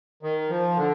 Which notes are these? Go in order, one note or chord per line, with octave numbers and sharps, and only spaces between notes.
D#3
F3
D3